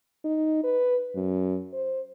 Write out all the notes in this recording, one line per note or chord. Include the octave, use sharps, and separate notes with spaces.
D#4
B4
F#2
C5